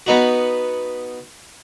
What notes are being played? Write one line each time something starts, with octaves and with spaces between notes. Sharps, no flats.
B3 D#4 F#4